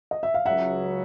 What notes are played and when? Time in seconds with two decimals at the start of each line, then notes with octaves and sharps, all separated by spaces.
0.11 D#5
0.23 E5
0.34 F5
0.46 C#2 C#3 F#3 E5 F#5